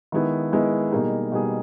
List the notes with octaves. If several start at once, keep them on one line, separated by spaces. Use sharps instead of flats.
D#3 G#3 B3 E4
D#3 G#3 B3 E4
B2 G3 A#3 D#4 G#4
B2 G3 A#3 D#4 G#4